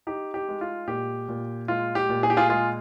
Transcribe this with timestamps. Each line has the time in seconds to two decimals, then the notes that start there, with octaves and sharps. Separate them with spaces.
0.07 D#4 G4
0.34 G4
0.48 G#3
0.61 F4
0.87 A#2 G4
1.29 A#2
1.68 G#3 F4
1.95 G4
2.09 A#2
2.23 G#4
2.30 G4
2.37 F4 G#4
2.49 G#3 F4 G#4